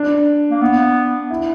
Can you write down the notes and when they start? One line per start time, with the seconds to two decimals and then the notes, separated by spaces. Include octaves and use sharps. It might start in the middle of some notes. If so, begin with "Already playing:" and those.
Already playing: D4
0.50 A#3
0.61 B3
1.30 E4